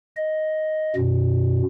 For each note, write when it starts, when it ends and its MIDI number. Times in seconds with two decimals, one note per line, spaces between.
0.17 0.95 75
0.96 1.62 42
0.96 1.62 47